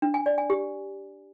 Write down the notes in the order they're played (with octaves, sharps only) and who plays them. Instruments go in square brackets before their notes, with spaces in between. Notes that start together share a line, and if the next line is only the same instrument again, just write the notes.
[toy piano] D4
G#5
D5
G#5
G4